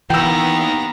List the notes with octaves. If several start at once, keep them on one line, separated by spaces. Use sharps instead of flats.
D#2 D#3 E3 B3 G5 A#5 E6